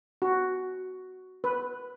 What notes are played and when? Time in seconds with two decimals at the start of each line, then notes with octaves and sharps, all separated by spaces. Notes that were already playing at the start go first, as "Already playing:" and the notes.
0.22 F#4
1.44 B4